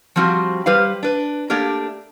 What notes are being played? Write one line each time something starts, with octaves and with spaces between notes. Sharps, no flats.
F3 G3 C4 F4 F#4
G3 G4 B4 C5 F5
D4 B4
A3 A#3 D4 G4 A#4